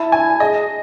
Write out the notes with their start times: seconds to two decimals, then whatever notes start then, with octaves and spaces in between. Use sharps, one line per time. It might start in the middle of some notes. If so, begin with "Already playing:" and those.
Already playing: E4 A5
0.12 G#5
0.40 G#4 D#5